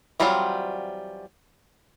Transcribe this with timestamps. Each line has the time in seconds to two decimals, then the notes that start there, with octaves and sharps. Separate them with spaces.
0.20 E3 F#3 G3 C4 F4